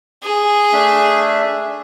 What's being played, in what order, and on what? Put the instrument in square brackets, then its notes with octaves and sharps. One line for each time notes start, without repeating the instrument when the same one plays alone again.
[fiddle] G#4
[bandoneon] A3 D4 E5